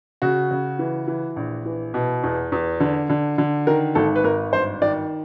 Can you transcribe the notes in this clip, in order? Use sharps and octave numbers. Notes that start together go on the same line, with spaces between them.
C#3 F#4
C#3
E3
E3
A#1
E3
B2
E2
E2
D3
D3
D3
D#3 A#4
G#1 A4
B4
G#1 A#4
G1 C5
D#3 D5